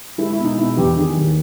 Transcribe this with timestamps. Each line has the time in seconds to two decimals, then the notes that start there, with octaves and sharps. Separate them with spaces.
0.18 G#3 E4
0.33 E4
0.39 B2
0.45 D#4
0.58 B2 E4
0.77 E2 G4
0.97 D#3 G#4
1.17 D#2